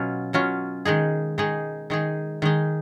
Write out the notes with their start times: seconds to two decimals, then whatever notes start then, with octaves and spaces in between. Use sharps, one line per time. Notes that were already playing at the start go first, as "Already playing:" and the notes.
Already playing: B2 F#3 C#4 F4
0.33 B2 F#3 C#4 F4
0.85 D#3 G#3 D#4 G#4
1.38 D#3 G#3 D#4 G#4
1.90 D#3 G#3 D#4 G#4
2.42 D#3 G#3 D#4 G#4